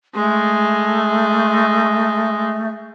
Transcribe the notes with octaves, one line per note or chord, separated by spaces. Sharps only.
G#3 A3